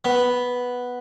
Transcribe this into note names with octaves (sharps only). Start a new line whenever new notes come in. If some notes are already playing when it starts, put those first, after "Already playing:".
B3